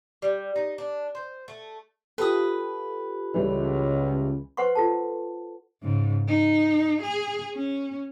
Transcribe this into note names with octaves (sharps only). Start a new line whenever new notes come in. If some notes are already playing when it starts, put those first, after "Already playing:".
G3
D#4
D4
C5
A3
F4 G4 A4 B4 D#6
C#2 E3 G3
B4 C5 F#5 C6 C#6
F4 A4 A5
G#2 C#3
D#4
G#4
C#4